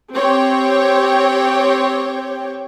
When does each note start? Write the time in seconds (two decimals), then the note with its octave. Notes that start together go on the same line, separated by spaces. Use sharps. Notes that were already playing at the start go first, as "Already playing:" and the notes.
0.14 C4 G4 C#5 G5